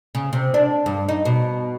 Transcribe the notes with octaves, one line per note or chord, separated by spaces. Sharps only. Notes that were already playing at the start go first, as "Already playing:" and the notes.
C#3
C3
D4
G2
D#4
B2